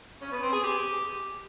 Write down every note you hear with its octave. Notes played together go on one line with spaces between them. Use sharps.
C#4
B3
C4
G#4
G4